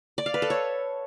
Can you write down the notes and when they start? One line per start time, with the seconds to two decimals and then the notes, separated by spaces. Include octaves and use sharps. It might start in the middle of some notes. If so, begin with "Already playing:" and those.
0.18 D5
0.26 F5
0.34 B4
0.42 A4
0.50 C#5